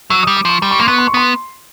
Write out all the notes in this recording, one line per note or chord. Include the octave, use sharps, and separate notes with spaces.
F#3 E6
D#6
G3
D6
F3 C#6
G3 C6
C#6
A#3 C6
B3 C#6
C6
C#6
B3 C6